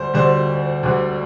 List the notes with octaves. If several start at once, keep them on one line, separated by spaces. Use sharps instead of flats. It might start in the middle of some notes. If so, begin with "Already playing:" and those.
Already playing: D2 D3 G3 C5
D2 D3 G3 C5
D2 D3 G3